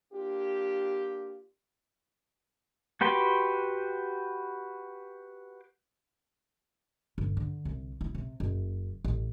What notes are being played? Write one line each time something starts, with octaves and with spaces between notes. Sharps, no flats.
A#3 D4 F4 G4
F#4 G4 B4 G5 C6
G1
D3
C2
E4
C3
F#1
A1